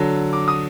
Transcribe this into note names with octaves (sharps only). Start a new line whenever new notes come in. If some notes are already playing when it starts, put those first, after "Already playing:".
Already playing: D3 F#3
D6
D#6